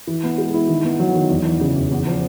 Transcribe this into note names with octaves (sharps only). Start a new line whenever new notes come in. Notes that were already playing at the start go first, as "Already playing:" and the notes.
E3
B3
G#3
E4
D#3
B3
F#3
D#3
E2
E3
C#3
E2
E2
F3